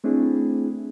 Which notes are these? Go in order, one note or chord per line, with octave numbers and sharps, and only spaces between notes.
A3 C4 D4 E4 G#4